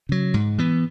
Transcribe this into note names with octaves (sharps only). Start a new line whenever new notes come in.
C#3 F#3
G#2
E3 B3